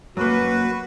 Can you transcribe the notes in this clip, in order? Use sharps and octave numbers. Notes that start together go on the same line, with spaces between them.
F#2 A#3 F#4 B4